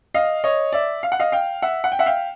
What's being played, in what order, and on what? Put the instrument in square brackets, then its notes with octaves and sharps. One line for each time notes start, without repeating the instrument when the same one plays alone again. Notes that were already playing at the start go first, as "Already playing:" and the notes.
[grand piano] D#5 F5
C#5 D#5
D5 E5
F5
F#5
D#5 F5
F5 G5
E5 F#5
F#5
G5
E5 F#5
F5 G5